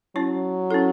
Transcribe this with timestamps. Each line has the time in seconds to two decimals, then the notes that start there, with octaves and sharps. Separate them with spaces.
0.16 F#3 C#4 E4 C#5
0.71 C#4 E4 A4